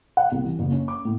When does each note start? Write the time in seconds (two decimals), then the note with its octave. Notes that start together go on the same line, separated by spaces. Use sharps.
0.17 F#5
0.32 C2
0.45 E3
0.59 F#1
0.72 C#4
0.88 D6
1.05 A2